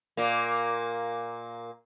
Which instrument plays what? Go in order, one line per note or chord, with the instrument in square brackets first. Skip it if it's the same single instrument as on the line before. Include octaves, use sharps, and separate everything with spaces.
[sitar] A#2 A#3